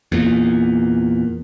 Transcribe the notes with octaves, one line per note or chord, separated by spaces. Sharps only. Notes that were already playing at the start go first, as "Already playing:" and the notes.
E2 A#2